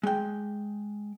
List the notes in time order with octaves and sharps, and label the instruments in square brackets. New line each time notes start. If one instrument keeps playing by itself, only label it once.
[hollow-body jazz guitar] G#3 G5